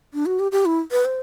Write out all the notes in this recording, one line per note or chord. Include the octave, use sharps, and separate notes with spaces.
D4
F#4
G4
G4
E4
B4
C5